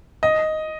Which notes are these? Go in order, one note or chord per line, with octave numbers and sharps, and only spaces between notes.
D#5